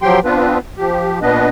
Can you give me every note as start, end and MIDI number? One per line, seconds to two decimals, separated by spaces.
0.02 0.20 53
0.02 0.20 54
0.02 0.20 67
0.02 0.20 79
0.02 0.20 84
0.25 0.58 59
0.25 0.58 60
0.25 0.58 62
0.25 0.58 65
0.25 0.58 71
0.78 1.19 53
0.78 1.19 67
1.22 1.49 46
1.22 1.49 59
1.22 1.49 62
1.22 1.49 71
1.22 1.49 75